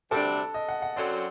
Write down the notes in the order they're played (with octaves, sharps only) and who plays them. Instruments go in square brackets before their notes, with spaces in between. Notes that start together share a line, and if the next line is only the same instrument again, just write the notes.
[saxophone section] D2 C3 G3 D4 [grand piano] A4
[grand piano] D#5
F#5
F#5
[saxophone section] F#2 F#3 C4 F#4 A4 [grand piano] D5